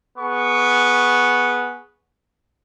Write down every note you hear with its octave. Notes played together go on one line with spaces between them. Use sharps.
B3 G#4 C#6